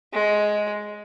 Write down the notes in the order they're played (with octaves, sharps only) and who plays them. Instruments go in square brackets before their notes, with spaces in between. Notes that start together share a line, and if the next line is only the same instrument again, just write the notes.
[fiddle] G#3